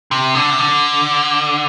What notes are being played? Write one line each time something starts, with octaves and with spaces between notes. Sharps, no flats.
C3
D3
C3
D3